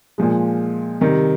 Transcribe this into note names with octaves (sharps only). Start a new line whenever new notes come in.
A#2 F3 G#3
C3 D#3 G3